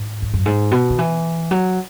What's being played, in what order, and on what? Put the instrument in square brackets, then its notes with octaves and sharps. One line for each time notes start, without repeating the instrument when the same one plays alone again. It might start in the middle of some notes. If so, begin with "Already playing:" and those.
Already playing: [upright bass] G#2
E2
F#2
G#2
B2
D#3
E3
F#3